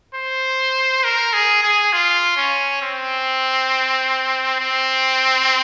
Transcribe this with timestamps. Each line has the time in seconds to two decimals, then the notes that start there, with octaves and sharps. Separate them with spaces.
0.14 C5
1.04 A#4
1.33 G#4
1.63 G#4
1.93 F4
2.37 C#4
2.82 C4
4.60 C4